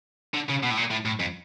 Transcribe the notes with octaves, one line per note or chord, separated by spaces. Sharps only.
D3
C#3
B2
A2
A#2
A2
A2
F2